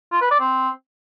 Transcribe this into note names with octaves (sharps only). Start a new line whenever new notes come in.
F4
B4
D5
C4